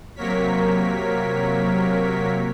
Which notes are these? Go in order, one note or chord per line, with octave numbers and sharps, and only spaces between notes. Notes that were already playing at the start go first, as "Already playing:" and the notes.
C3 F#3 A#3 A#4 C#5 B6